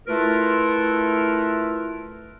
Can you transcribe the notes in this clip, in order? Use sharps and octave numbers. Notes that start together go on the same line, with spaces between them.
A3 E4 F4 A#4 B4